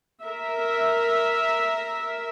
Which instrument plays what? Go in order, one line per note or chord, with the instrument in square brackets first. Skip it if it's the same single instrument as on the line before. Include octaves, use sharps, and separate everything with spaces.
[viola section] A#4 E5